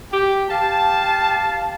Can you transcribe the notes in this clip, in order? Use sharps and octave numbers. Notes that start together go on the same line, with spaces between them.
G4
G4 F5 A5